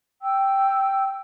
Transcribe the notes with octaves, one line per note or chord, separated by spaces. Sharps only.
G5 E6